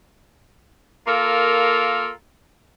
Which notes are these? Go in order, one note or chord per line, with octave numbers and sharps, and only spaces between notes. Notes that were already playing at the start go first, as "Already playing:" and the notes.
A#3 F4 A4 A#4 F5